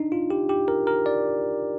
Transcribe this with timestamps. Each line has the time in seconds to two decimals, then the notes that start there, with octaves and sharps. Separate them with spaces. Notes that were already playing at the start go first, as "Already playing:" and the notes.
Already playing: D4 D#4
0.12 F4
0.30 G4
0.49 G4
0.68 A#4
0.87 A#4
1.06 D5